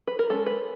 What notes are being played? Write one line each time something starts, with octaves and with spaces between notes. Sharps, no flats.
B4
A#4
G#3 C#4 A4
B4